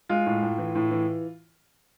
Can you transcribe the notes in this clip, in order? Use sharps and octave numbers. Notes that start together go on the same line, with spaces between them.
G#3 F4
A2
A2
E3
A2
E3